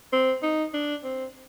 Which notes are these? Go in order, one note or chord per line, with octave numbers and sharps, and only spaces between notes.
C4
D#4
D4
C4